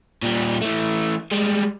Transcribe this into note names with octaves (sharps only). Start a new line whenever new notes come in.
A#2 G3
E3 A3
G3 G#3